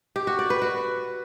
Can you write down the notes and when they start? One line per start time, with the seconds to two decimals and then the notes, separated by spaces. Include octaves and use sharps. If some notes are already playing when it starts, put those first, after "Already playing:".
0.16 G4
0.27 F#4
0.39 D5
0.50 B4
0.62 F#4